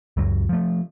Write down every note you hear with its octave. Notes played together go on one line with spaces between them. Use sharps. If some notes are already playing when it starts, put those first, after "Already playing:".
C#2 F#2 F#3
F3 A3